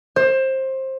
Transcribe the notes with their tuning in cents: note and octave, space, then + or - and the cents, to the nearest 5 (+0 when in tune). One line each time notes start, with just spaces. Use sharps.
C5 +20